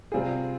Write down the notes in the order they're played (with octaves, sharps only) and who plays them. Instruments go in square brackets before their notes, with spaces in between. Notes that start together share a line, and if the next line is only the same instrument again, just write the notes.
[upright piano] C3 G3 C4 F4 G#4